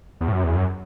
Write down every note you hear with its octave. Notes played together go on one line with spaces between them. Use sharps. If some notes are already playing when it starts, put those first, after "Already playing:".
E2
A2
F#2
E2
F#2